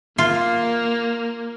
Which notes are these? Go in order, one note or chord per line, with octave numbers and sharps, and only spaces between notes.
A#3 F4